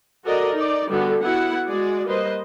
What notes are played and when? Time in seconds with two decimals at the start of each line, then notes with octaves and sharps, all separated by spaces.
0.24 F#4 A4 A#4 D5 D#5
0.54 D#4 D5
0.90 D3 G3 B3 F#4 G4 A4
1.22 B3 E4 F#4 F#5
1.68 G#3 F#4 G#4 D5
2.07 G3 A#3 B4 C5 D#5